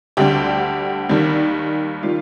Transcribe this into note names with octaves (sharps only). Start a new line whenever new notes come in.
D2 D3 G3 G4
D#2 D#3 G3
D#3 G3 F4